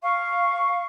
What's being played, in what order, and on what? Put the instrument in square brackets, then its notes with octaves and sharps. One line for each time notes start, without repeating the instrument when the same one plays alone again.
[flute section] F5 C#6